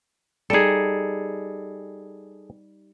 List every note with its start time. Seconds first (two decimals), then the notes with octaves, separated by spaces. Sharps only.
0.50 G3 D#4 G#4 A4